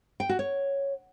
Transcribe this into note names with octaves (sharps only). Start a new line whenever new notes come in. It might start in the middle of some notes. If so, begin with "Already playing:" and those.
G5
F#4
C#5